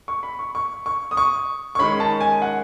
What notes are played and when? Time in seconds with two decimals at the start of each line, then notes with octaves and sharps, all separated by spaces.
0.08 C#6
0.23 B5
0.39 C#6
0.55 C#6
0.86 C#6
1.11 D#6
1.17 C#6
1.75 C#6
1.79 D#3 G#3 C#4 B5
2.00 A5
2.21 G#5
2.42 F#5